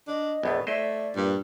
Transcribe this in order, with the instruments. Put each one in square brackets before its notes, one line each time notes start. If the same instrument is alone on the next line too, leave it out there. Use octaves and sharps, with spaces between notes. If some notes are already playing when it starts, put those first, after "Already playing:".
[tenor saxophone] D4 [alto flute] D#5
[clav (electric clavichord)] A#1 E2 A3 [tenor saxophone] B3
[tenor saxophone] A3 [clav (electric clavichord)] E4 C5 D#5 [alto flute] D5
[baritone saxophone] G2 [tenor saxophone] A#2